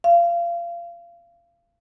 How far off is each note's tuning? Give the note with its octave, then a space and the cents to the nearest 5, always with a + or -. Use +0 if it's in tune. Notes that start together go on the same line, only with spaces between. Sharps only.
F5 -25